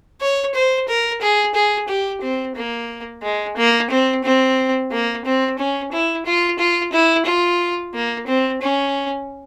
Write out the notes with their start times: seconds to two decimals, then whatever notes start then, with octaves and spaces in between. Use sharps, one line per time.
0.21 C#5
0.55 C5
0.88 A#4
1.21 G#4
1.54 G#4
1.88 G4
2.22 C4
2.55 A#3
3.23 G#3
3.57 A#3
3.90 C4
4.24 C4
4.92 A#3
5.25 C4
5.59 C#4
5.92 E4
6.26 F4
6.59 F4
6.93 E4
7.26 F4
7.94 A#3
8.27 C4
8.61 C#4